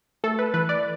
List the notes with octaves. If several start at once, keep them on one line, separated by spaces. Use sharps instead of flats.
A3 A4
B4
E3 B4
D5